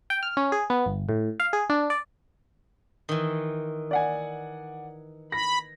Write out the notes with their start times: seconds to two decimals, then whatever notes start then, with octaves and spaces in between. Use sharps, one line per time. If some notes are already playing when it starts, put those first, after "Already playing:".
0.10 G5
0.23 F6
0.37 C#4
0.52 G#4
0.70 B3
0.86 G1
1.09 A2
1.40 F5
1.53 G#4
1.70 D4
1.90 D5
3.09 D#3 E3
3.91 D5 F#5 G#5
5.32 B5 A#6